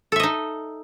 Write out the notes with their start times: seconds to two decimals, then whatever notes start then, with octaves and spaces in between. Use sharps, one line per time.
0.12 A4
0.16 E5
0.20 D#5
0.23 D#4